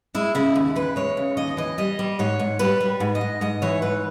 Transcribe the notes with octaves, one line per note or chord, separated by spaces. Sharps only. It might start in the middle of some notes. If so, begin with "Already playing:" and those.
G#3 E4
C#3 E4
D#2
E3 B4
G#3 C#5
C#3
D#2 D#5
E3 D#5
G3 D#5
G3
G#2 C#5
G#2
G3 B4
G3
G#2
D#5
G#2
G#2 D#5
E3 C#5
G#2 B4